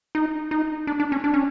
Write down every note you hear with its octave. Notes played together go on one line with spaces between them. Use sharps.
D#4
D#4
D4
D4
C#4
D4
C#4